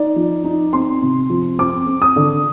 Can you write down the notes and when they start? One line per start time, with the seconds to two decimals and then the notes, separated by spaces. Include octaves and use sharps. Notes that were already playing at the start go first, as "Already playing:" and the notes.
Already playing: D#4 D5
0.16 F3
0.44 D#4
0.73 C4 C6
1.02 C3
1.30 F3
1.59 C4 D6
1.87 C4
2.02 D#6
2.16 D3